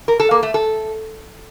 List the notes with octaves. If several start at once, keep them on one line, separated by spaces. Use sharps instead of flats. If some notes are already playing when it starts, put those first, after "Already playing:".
A#4
A4
A#3
A3
A4